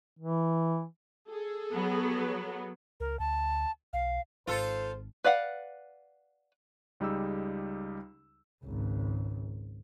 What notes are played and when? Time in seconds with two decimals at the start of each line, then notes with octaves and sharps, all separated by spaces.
0.19 E3
1.29 G#4 A4
1.73 F#3 B3
3.00 C#2 A#4
3.19 D2 A5
3.93 B1 F5
4.47 G#1 F4 A4 C5
5.24 B4 D5 F5 F#5
7.00 C#2 G3 D#4 G4 G#4 E6
8.64 G#1 C#2